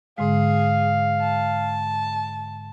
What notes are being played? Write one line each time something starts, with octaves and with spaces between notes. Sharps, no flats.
G#2 D3 G#3 G#4 F5
A5